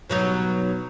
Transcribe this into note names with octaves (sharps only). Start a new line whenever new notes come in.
B2 F#3 D#4